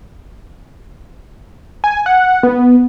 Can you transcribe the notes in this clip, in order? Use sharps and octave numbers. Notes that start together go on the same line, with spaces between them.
G#5
F#5
B3